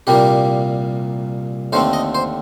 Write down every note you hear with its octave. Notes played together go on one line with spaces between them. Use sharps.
C2 A#2 G3 A#3 G4
D#2 D3 A3 C4 C5
D#5
C5